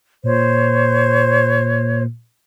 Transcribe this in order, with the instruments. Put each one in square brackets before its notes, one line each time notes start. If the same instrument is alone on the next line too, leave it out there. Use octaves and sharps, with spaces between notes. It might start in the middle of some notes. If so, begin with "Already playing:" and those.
[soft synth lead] A#2 [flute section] C5 C#5